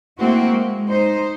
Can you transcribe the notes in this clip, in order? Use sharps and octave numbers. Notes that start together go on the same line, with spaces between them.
A3 A#3 C4 E4 F#4
G#3
D#4 C5